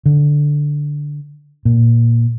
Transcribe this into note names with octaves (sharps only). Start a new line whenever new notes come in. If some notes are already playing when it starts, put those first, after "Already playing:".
D3
A#2